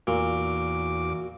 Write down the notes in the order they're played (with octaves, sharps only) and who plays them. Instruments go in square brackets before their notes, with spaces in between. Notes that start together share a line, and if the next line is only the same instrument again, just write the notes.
[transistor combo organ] E2 D6 [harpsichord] A#2 [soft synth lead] F#4